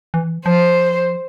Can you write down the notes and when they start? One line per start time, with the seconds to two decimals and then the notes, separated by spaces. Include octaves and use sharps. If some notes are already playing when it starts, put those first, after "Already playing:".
0.14 E3
0.46 F3 C5